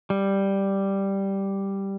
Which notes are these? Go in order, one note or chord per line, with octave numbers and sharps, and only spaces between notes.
G3